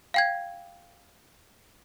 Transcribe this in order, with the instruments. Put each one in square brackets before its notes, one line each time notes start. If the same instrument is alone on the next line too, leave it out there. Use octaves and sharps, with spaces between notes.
[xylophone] F5 G5 G#6